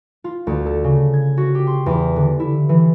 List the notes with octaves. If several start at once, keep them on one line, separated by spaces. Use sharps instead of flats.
F4
D2
A4
C#3
G#6
F#4
G4
C6
E2
D3
E4
E3